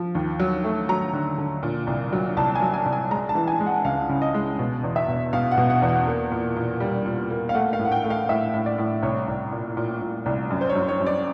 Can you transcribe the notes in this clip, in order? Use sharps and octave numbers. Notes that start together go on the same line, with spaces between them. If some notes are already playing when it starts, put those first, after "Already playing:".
Already playing: F3
D#2
F#3
A3
F#3 A#5
D3
D3
A#2
C2
F#3
C2 A5
G#5
F#3
G#5
C2
G#5
G#3 A#5
A5
E3
G#5
G#3
F#5
C#2 F5
C#3
D#5
G#3
B2
E2
E5
B2
B2 F5
F#5
B2
F#5
E2
F#5
A#3
A#2
A#2
G3
A#2
A#3
F5
A3 F#5
F5
A2
F#5
G5
A3
F5
A2 E5
A2
D5
A2
C2 C#5
C2
A#2
A#2
A#2
C2
F#2
C5
C#5
F#2
C#5
F#2
D5